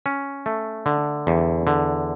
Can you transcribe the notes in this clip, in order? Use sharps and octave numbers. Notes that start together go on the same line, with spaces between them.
C#4
A3
D3
E2
D3